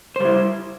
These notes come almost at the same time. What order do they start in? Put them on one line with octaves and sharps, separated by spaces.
C5 G3 E4